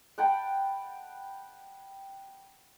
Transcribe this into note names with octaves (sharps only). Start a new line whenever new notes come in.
F#5 G5 A5 B5